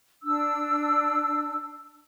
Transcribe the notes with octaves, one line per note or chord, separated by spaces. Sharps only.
D4 E6